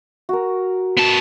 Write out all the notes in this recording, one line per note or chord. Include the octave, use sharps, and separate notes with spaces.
F#4 A#4
B3 A5